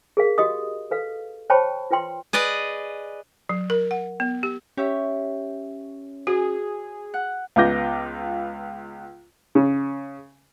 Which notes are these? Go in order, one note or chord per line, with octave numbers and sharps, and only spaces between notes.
G#4 A#4 F5
F#4 G4 D#5 D#6
A4 B4 F5
C5 C#5 G5 A5 B5 C#6
F4 B4 G5 C6
G#4 B4 D5 D#5
F#3
A#4
F#5
B3
G4
C#4 G4 C#5 E5
F#4 G#4
F#5
C#2 B3 F4 D6 G6 A#6
C#3